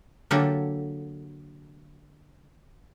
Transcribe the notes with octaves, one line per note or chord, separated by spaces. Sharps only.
D3 F#3 A#3 G4 A4